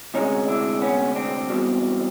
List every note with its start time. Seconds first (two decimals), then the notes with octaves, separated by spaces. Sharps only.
0.14 D2 C3 E3 G#3 C#4 D#4
0.48 D4 E4
0.82 B3 C#4
1.15 C4 D4
1.50 E2 B2 G3